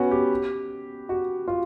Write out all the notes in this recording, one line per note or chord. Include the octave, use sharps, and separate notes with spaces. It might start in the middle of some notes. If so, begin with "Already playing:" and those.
Already playing: B3 C#4 F#4
G4
F#4
F4